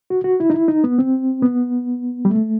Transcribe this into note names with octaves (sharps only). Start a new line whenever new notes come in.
F#4
F#4
E4
D#4
E4
D#4
B3
C4
B3
G3
A3